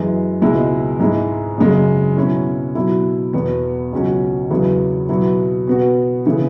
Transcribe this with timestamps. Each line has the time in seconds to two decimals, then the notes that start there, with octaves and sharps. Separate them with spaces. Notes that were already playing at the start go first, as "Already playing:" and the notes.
Already playing: F#2 E3 G#3
0.42 C#2 B2 G#3 E4
0.99 G#2 G#3 E4
1.58 F#2 C#3 G#3
2.17 B2 F#3 C#4 E4
2.75 B2 F#3 E4
3.33 E2 B2 B3
3.93 C#2 B2 F#3 C#4 F#4
4.50 E2 C#3 F#3 B3 E4
5.09 B2 F#3 B3 E4
5.67 B2 B3 F#4
6.26 C#3 E3 B3